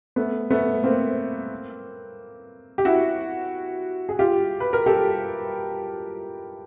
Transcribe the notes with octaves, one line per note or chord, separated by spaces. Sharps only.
A3 B3
A3 B3
A#3 C4
G4
E4 F#4
G#4
F4 G4
B4
A#4
G4 A4